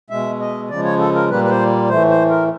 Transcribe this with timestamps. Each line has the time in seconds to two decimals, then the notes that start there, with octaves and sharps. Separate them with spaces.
0.10 B2 G#3 E5
0.40 D#5
0.69 C#3 F3 G#3 D5
0.84 C#5
0.99 A4
1.15 A#4
1.29 A#2 G3 A#3 B4
1.44 B4
1.50 C5
1.89 A2 E3 A3 C5
2.09 C5
2.30 A#4